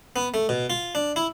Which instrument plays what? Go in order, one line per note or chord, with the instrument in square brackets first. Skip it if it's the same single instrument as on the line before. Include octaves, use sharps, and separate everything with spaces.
[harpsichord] B3
A3
B2
F4
D4
E4